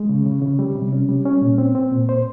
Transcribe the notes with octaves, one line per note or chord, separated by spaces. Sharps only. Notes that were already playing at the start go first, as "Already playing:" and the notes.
Already playing: G#3
C#3
C#3
C#3
G3
C3
C#4
G3
C#4
A#2
C4
C4
A#2
C5